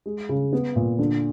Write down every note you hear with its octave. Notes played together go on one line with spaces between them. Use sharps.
G#3
C#3
B3
A#2
D3